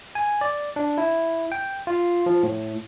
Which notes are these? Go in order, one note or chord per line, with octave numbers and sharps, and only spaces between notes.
G#5
D5
D4
E4
G5
F4
F3
A2